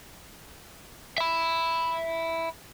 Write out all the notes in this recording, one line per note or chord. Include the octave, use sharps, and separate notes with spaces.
E5 B5